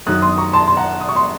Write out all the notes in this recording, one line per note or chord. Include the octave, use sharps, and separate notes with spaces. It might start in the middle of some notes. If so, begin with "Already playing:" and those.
F#2 D#3 F#3 D#6 F#6
C6 D#6
A#5 C#6
A5 C6
C6
F#5 A#5
D#6
C#6
C6